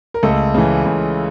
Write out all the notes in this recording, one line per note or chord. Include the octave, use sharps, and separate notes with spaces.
A#4
C#2 A3 A4
C#3 E3
C#2